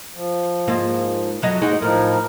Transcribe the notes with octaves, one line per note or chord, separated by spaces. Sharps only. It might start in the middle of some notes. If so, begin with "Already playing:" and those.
F3
G#2 A#3 F4
F2 F#3 D#5
D#2 G#2 G#3 D#4 F#4
A2 F3 D#4 A#4